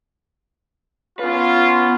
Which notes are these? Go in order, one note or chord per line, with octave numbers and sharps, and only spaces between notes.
B3 C#4 F4 B4